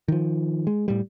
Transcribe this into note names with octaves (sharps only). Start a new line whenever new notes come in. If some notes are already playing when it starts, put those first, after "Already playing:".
D#3 F3
G#3
A2 G3